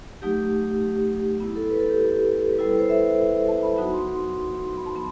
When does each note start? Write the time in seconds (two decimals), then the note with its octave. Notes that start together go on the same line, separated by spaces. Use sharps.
0.22 F#3 A3 D#4 G4
0.81 G4
1.40 B3 E4
1.55 A4
1.70 B4
1.80 A4
1.90 G4
2.00 G4
2.52 B4
2.59 G3 B3 E4 A4
2.69 B4
2.79 C5
2.89 E5
3.48 A5
3.63 B5
3.77 F#3 B3 D#4 F#4
3.93 C6
4.08 C6
4.67 C6
4.77 B5
4.86 A5
4.96 B3